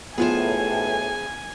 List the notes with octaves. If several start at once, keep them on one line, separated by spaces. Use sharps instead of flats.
B1 A2 B3 F4 G#4 C5 G#5